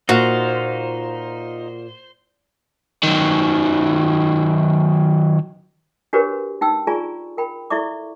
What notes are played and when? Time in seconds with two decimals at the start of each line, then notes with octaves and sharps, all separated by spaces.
0.09 A#2 D#4 F4 F#4 C5 F5
3.03 D#3 F#3
6.13 D4 F#4 G4 A#4 B4 C#5
6.61 D#4 G5 E6
6.87 F4 G#4 D5 G#5 A#5 C#6
7.37 A#4 G5 B5
7.70 E4 A4 D5 E5 C#6 D6